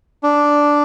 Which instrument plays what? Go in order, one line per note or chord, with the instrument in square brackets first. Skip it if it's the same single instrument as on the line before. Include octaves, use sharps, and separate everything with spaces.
[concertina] D4